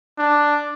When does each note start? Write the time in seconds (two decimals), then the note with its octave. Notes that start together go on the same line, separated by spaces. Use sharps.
0.18 D4